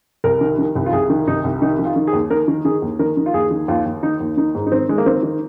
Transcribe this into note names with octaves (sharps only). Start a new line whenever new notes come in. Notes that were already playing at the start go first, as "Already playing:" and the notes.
C2 A#4
D#3
D#3
C2
F4
C2 G#4
D#3
C2 D#4
C2
D#3 D#4
D#3
F4
D#3
G#4
D#2
D#3 A#4
D#3
D#3 G#4
D#2
D#3 A#4
D#3
F4
D#2 G#4
D#3
D#2 F4
D#2
D#3 D#4
D#2
D#3 D#4
G#2
D#4
D#3 C4
D#3 G#3
A#3
D#3 C4
D#3